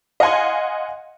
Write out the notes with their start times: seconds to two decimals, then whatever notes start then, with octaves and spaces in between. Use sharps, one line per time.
0.20 D#5 F5 F#5 G#5 C6